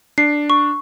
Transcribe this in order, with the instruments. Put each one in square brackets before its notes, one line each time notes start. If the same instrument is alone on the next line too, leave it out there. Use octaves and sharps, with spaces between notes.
[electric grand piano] D4 [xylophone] C7
[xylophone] C#6